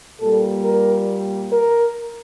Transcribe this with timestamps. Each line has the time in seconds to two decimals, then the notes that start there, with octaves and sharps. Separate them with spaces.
0.20 A#2 G3 A#3 A4
0.64 A#4
1.51 A#4